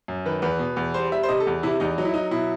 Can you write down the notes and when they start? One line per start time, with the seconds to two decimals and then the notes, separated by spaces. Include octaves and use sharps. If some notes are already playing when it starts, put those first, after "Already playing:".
0.08 F#2
0.26 D#3 B4
0.42 E2 B4
0.59 B2
0.76 E2
0.94 G3 C5
1.12 G3 E5
1.23 C5
1.28 C3 D#5
1.40 A4
1.46 E2
1.63 C3 E4
1.80 E2 D#4
1.98 F#3 D#4
2.05 E4
2.14 F#3 D#4
2.31 B2 E4